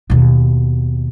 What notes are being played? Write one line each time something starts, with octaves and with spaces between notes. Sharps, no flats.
D#2 B2